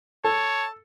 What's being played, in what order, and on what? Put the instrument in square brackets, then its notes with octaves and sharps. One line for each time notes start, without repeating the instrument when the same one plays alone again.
[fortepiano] A4 [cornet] C#5 [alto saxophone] A5